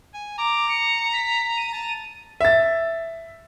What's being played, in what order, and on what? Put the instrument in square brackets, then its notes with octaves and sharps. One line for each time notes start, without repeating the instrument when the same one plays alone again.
[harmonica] G#5
[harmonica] A#5 [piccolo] D6
[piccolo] C#7
B6
D#7
[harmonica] A5 A#5
[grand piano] E5 A6